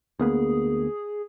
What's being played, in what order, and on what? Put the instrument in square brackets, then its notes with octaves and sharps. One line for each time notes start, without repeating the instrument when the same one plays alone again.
[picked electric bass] D2 A#3 B3 [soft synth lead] G#4